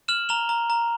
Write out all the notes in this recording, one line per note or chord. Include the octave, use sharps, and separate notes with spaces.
F6 E7 F#7
A#5 F7 G7
A#5
A#5